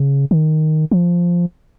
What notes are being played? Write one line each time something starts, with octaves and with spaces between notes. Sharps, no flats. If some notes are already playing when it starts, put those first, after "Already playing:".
Already playing: C#3
D#3
F3